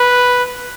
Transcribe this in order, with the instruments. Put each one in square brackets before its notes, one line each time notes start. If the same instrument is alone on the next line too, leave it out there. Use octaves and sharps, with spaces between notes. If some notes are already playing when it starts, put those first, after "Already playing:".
Already playing: [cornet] B4